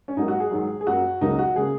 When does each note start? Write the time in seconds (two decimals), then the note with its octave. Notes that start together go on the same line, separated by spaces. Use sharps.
0.08 C#4
0.17 G#2 F#3 A#3 D#4
0.28 F#4
0.40 G#4
0.51 G#2 D#3 F#3
0.81 G#4
0.86 F#2 F#3 A#3 F#4
1.21 C#2 C#3 F#3 A#3 D#4
1.39 F#4
1.56 C#3 A#3 G#4